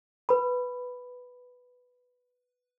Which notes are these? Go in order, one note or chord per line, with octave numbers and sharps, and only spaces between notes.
B4 B5